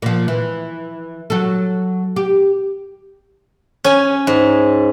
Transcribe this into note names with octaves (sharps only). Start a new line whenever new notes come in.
A#2 F3
E3
F#3 A4
G4
C#4 G#5
G#2